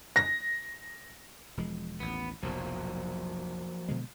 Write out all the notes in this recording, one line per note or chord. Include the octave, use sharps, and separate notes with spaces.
A#6
E1 F3 G#3
A1 D#2 B3
F1 B1 F3 F#3 A#3
B2 D3 G#3